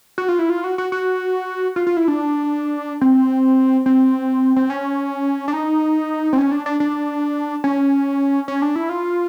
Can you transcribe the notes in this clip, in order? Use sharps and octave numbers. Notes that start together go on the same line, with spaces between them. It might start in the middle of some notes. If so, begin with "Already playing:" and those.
F#4
F4
E4
F4
F#4
F#4
F#4
F4
F4
E4
D4
C4
C4
C4
C#4
D4
D#4
C4
C#4
D4
D4
D4
C#4
C#4
D4
E4
F4